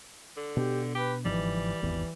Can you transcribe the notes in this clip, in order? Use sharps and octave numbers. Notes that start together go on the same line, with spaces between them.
D3
B2 D4 G4
G4 B4
G1 G#2 E3 F3 G3
D1 G#1 E2 E3